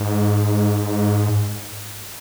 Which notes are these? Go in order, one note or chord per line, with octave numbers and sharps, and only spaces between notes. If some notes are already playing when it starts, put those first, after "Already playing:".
Already playing: G#2